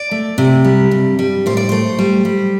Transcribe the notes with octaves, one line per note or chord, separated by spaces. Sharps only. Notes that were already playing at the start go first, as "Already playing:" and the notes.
Already playing: D5
A3
C3
G3
G2
G3
A2 C5
D5
A3 C5
G3
G3